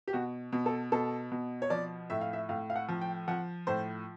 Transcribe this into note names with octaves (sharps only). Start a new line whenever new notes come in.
G4
B2 F#4
B2
A4
B2 A4
B2
C#5
F3 D5
A2 E5
F5
E5
A2 F5
F5
F#5
F3
G5
F3 F#5
A2 C5